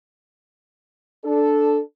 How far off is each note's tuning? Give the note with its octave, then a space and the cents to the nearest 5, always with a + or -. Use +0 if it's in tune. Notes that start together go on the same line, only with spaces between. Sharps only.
D4 +0 A4 -5